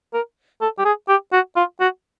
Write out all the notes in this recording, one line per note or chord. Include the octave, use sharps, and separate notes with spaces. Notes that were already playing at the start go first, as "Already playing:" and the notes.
A#4
A4
G4
G#4
G4
F#4
F4
F#4